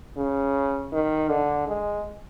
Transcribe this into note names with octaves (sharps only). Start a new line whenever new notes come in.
C#3
D#3
D3
G#3